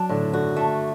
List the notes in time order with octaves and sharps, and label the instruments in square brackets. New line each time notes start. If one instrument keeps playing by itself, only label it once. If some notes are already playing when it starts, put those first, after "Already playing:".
Already playing: [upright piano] F#3 [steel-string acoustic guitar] D4
[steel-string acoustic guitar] A2 [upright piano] D3
[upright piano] D3 [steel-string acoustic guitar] F#4
[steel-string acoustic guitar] A3